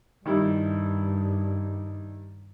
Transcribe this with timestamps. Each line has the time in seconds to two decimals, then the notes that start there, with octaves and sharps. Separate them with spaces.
0.26 G2 D#3 G3 E4